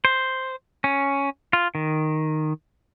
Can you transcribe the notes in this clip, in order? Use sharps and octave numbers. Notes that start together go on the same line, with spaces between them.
C5
C#4
F4
D#3